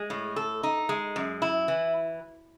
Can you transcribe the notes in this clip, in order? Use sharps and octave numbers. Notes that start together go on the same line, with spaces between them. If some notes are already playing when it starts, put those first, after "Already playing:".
Already playing: G#3
A2
A4
D#4
G#3
F#2
E4
E3